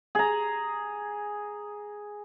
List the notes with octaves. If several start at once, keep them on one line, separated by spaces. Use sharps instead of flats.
G#4 A#5